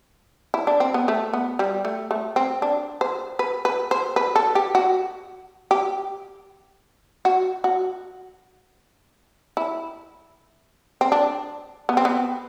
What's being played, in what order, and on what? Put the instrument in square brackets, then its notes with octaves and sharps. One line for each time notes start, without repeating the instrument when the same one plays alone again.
[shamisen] E4
D4
C4
B3
A3
B3
G3
A3
A3
C4
D4
C5
B4
B4
C5
B4
A4
G4
F#4
G4
F#4
F#4
E4
C4
D4
B3
C4
B3